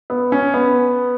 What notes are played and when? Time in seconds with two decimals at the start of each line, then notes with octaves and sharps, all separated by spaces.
0.10 B3
0.32 C#4
0.54 B3